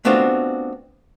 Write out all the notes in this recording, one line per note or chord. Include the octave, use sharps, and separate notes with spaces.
A3 B3 C4 D4 F4 F#4